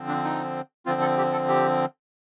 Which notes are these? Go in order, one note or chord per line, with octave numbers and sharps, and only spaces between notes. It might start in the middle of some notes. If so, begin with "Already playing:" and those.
Already playing: D3 F3 C4
D4
D#4
D3 F3 C4 F4
A4
G4
A4
G4